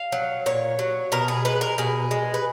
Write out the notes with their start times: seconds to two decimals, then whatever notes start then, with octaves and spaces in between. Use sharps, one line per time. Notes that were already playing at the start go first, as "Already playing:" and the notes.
Already playing: F5
0.12 F#3
0.46 A#2 C#5
0.79 F#3
1.12 B2 A#4
1.28 G#4
1.45 G#3 B4
1.61 A#4
1.78 B2 G#4
2.11 G#3
2.34 B4